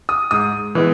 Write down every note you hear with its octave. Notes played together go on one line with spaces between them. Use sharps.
D#6
G#2 D#6
E3 G#3 B3